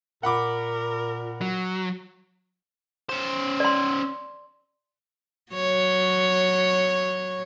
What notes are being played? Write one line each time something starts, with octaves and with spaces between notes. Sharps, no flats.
A#2 A#4 F#5 B5 D6
F#3
C#4 C5
D5 C6
F#3 C#5